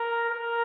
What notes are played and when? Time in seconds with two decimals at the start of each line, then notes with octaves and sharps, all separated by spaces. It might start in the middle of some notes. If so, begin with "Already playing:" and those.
Already playing: A#4
0.30 A#4